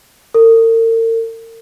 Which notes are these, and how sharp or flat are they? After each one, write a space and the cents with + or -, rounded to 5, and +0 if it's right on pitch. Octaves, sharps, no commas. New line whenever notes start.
A#4 -45